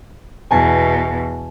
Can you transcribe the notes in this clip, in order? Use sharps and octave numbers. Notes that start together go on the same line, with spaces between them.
E2 B2 G#5 A5